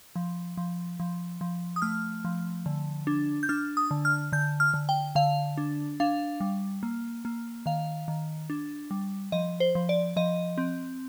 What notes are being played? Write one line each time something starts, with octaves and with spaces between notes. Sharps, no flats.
F3
F3
F3
F3
D#6
A3 F6
F3
D3
D4
G6
D4 F6
D#6
D3
F6
D3 G6
F6
D3
G5
D3 F5
D4
D4 F5
G3
A#3
A#3
D#3 F5
D#3
D4
G3
F3 D#5
C5
F3
D5
F3 D#5
C4